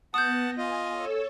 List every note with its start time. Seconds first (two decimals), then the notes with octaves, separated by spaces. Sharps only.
0.14 B3 F#5 A5 D#6 G6 A#6
0.58 F4 D#5 G#5
0.91 A4 C#5 E6